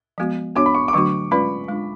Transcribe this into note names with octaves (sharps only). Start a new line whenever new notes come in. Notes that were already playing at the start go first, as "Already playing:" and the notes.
F3 G#3 B3 F#4
B3 D4 F#4 C#5 D6
B5
C#6
D6
D3 F#3 A3 D4 F#4 C#6
G#3 C#4 F4 B4 D5 B5
G#3 D4 F4